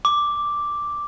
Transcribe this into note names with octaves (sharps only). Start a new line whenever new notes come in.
D6